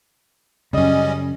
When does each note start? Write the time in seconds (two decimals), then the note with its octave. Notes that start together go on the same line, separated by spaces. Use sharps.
0.73 F#2 C#3 G3 C#4 D#5